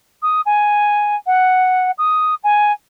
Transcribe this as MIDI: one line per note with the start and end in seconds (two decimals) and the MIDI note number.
0.22 0.41 87
0.46 1.16 80
1.27 1.91 78
1.98 2.35 87
2.44 2.72 80